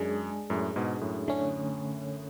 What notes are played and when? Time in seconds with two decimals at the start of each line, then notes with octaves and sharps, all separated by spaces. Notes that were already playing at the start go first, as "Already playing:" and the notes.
Already playing: F#2 G#3 D4 G#4
0.50 F#2 A2
0.76 G#2 B2
1.01 F#2 A2
1.28 D3 A3 C#4